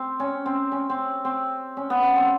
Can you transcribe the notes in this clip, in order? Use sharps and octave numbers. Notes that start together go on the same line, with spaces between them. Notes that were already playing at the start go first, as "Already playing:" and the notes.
Already playing: C4
C#4
C4
C#4
C4
C4
C#4
B3
B3
C4